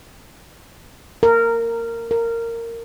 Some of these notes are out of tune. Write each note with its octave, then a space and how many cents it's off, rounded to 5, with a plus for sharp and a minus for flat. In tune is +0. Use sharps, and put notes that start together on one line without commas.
A#4 -15
A#4 -15